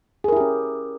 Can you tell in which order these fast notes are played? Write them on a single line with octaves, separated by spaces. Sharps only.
G#4 A#4 E4 G4 C#4